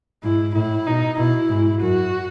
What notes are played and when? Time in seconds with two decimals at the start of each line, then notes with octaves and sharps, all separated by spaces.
0.23 G#2 E4
0.54 A2 E4
0.86 B2 D#4
1.18 B2 E4
1.49 G#2
1.81 F#2 F#4